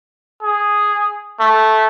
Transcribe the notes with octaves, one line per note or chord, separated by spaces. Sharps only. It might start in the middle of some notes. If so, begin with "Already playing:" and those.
G#4
A3